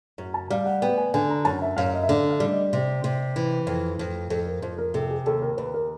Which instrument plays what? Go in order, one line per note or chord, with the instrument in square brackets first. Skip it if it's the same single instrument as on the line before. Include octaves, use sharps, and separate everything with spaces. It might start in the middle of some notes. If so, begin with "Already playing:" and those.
[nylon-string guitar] F#2
[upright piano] A5
[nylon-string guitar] G3 [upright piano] F5
[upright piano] F#5
[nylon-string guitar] B3 [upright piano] G5
[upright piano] G#5
[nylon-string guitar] D3 [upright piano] G#5
[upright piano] A#5
[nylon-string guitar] F#2 [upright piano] A5
[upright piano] E5
[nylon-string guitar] F#2 [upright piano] F5
[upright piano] D#5
E5
[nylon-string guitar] D3 [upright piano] F5
[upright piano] F5
[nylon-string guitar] G3
[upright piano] D#5
[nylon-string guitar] C3
C3
E3
F2
[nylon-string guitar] F2 [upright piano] C5
[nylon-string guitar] F2 [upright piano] A4
[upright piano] A#4
[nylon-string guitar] F2 [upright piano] C5
[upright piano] A#4
[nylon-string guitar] C3 [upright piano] A4
[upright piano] G#4
[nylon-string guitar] D#2 [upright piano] A4
[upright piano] A#4
[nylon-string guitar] D#2 [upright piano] B4
[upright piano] A#4